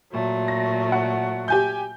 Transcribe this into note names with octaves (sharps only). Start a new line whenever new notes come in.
A#2 F#3 A3
A#6
F#5
G4 G#5 G6